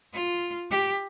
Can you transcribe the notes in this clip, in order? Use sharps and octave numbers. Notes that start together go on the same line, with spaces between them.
F4
G4